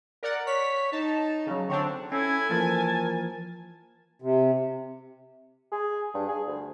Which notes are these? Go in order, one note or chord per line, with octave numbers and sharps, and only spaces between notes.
A#4 D5 F#5
C#5 B6
D#4 A5
C#3 F#3
D3 C4 D4 C#5
C#4 E4 A4 G#5
E3 F3 A#3 A#4 A5
C3
G#4
G2
G#4
D2